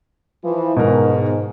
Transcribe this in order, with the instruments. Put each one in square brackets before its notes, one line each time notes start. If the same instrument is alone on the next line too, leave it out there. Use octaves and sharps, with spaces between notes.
[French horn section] E3 F3
[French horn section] G#2 [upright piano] B2 D#3 A#4